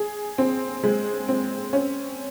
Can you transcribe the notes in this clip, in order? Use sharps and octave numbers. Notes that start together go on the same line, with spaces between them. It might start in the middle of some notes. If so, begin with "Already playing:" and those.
Already playing: G#4
C4
G#3
C4
C#4